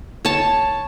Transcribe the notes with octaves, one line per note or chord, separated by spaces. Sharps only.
C#5 A5